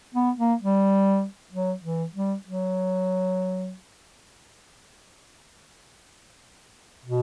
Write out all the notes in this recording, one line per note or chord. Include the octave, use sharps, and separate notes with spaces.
B3
A#3
G3
F#3
E3
G3
F#3
B2